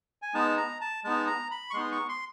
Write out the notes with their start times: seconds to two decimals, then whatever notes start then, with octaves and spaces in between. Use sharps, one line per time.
0.22 G#5
0.34 G#3 B3 D#4 A5
0.57 A#5
0.81 A5
1.04 G#3 B3 D#4 A5
1.27 A#5
1.51 B5
1.70 C#6
1.74 G#3 B3 D#4 C6
1.91 C#6
2.09 C6